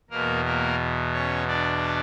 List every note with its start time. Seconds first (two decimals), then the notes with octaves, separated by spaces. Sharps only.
0.10 E2 B2 A#3 A#4
0.44 A#3 A#4
1.13 C#4 C#5
1.47 D4 D5